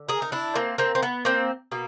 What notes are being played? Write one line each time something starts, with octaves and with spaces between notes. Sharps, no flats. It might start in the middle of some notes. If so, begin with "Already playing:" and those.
Already playing: D3
G#4 A#4
D#4
D4 E4
A#3 C4
A#3 C4
C4
B3
A#3 C4
B2 A#3